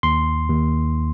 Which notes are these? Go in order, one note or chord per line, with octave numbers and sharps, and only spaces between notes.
D#2 C6
D#2